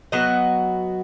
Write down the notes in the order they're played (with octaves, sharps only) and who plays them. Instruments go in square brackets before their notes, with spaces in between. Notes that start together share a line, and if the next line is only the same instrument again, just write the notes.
[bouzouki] F#3 B3 F#4 D#5